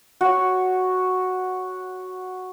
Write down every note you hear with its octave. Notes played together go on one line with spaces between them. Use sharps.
F#4 C#5